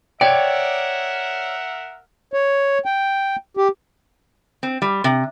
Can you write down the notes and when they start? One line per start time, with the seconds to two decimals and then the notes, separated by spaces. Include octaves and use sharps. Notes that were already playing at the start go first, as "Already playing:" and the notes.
0.21 A#4 C#5 D5 E5 F#5 G5
2.34 C#5
2.86 G5
3.57 G4
4.63 C4
4.82 G3
5.04 C3